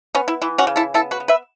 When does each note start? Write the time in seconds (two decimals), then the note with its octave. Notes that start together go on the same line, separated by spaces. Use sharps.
0.15 B3 C#4
0.28 E4
0.42 E3 E4
0.58 C#4 F#4
0.67 C#3
0.76 E4 A4
0.94 B3 E4 A4
1.11 F#4 B4
1.20 B3
1.28 B4 E5